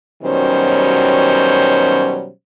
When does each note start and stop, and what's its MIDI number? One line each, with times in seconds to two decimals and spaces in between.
0.23 2.30 47
0.23 2.30 51
0.23 2.30 54
0.23 2.30 55
0.23 2.30 61
0.23 2.30 72